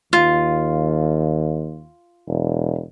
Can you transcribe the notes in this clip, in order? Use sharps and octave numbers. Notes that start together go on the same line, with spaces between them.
D#2 F4
E1